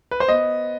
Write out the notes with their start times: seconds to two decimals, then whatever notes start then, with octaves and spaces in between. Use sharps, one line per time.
0.11 B4
0.20 C5
0.28 B3 D#5